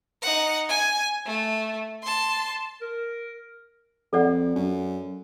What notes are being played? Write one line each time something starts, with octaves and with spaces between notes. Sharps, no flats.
D#4 F#5
G#5
A3
A5 C6
A#4
F2 A4 D5 F#5
F#2